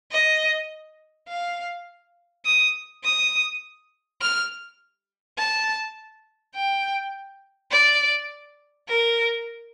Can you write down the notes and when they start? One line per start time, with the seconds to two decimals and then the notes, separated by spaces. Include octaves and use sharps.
0.12 D#5
1.28 F5
2.45 D#6
3.04 D#6
4.21 F6
5.37 A5
6.55 G5
7.71 D5
8.89 A#4